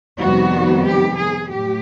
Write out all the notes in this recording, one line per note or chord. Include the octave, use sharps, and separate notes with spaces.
F2 C3 D#3 G3 B3 F#4
G4
G#4
A2 F#3 G4